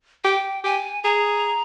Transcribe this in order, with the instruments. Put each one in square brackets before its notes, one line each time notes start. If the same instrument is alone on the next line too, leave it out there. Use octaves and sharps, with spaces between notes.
[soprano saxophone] G4 [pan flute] G5
[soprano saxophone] G4 [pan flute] G#5
[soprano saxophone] G#4 [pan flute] A#5